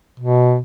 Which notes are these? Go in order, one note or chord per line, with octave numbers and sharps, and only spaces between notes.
B2